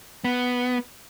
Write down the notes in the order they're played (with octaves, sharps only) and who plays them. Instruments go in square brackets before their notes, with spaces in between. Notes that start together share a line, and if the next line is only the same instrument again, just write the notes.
[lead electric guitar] B3